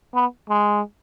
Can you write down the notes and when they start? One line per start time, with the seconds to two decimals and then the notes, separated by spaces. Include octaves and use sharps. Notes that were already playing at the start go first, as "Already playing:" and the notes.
0.15 B3
0.50 G#3